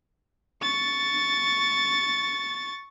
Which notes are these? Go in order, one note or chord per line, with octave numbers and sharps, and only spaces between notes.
C#6 A6